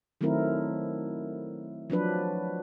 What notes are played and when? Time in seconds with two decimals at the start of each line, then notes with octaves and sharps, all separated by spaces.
0.21 D#3 F#3 A3 C4 E4 A#4
1.90 F3 F#3 D4 B4